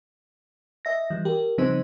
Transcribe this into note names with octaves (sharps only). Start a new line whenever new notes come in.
D#5 E5 A#6
E3 G3
G4 A#4
C#3 F3 G3 C4 D#4 C5